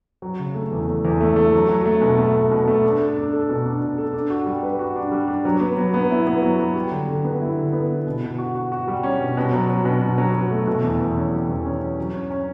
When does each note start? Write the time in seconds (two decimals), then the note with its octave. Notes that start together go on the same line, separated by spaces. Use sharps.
0.22 F#3
0.39 C#3
0.55 A3
0.72 E2
0.88 A3
1.05 E2
1.20 A3
1.36 A3
1.53 F#3
1.69 F#3
1.85 A3
2.02 B2
2.18 A3
2.35 A3
2.51 B2
2.68 A3
2.84 D4
3.00 A4
3.17 D4
3.33 A4
3.49 B2
3.66 D4
3.81 B2
3.98 A4
4.14 D4
4.30 F#4
4.46 G3
4.63 B4
4.79 F#4
4.96 D4
5.12 G3
5.28 D4
5.45 F#3
5.61 B3
5.77 F#3
5.94 B3
6.10 E4
6.27 B3
6.42 F#3
6.60 F#3
6.76 G3
6.92 D3
7.08 D3
7.24 B3
7.41 E4
7.57 D3
7.73 B3
7.90 E4
8.07 B2
8.22 B2
8.38 F#4
8.55 F#4
8.72 F#4
8.88 G3
9.03 C#4
9.21 B2
9.37 B2
9.52 F#3
9.70 F#3
9.85 B2
10.01 B2
10.18 F#3
10.35 F#3
10.51 A3
10.67 B2
10.83 E2
10.99 E2
11.16 C#4
11.32 G3
11.49 E2
11.65 C#4
11.82 C#4
11.98 F#3
12.14 C#4
12.31 C#4